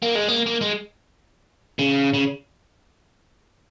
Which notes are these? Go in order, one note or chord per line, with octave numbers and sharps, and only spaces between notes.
A#3
G#3
A#3
A#3
G#3
C#3
C#3